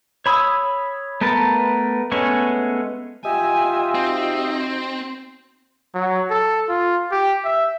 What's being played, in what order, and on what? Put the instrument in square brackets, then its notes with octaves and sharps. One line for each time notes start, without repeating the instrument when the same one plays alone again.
[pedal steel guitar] C#5 B5 D#6 E6
A3 B3 A#4 B4 A5
G#3 A3 B3 C#4
[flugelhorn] F4 [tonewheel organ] G4 D#5 E5 [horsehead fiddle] G#5
[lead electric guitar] C4 [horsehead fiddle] D#4 F#4
[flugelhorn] F#3
A4
F4
G4
E5